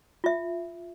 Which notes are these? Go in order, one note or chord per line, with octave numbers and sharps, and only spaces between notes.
F4 E5